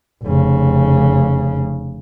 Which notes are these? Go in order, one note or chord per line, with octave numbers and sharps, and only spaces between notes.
F1 C#3